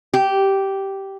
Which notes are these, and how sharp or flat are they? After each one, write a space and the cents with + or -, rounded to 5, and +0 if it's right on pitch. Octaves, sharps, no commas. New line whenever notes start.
G4 -10